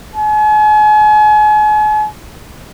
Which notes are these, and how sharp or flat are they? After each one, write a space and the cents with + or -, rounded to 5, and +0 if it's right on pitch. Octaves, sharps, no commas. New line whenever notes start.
G#5 +40